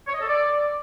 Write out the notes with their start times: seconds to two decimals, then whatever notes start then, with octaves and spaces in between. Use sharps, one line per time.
0.07 C#5
0.14 D#5
0.21 A4
0.28 D5